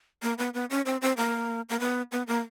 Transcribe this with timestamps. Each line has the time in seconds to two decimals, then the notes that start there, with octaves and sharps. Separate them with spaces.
0.22 A#3
0.38 B3
0.54 B3
0.70 C#4
0.86 C4
1.02 C4
1.17 A#3
1.69 A#3
1.80 B3
2.12 B3
2.27 A#3